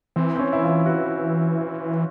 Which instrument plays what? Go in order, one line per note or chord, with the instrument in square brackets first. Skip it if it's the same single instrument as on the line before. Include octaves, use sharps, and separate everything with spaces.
[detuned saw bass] E3 [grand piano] C4
[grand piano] C4
C#4
E4
F4
F#4